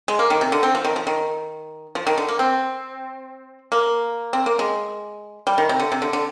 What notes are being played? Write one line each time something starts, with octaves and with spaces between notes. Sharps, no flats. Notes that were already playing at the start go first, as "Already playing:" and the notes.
G#3
A#3
D#3
C3
D3
C4
F3
D#3
F3
D#3
F3
D#3
D3
A#3
C4
A#3
C4
A#3
G#3
G3
D#3
C3
D3
C3
D3
D3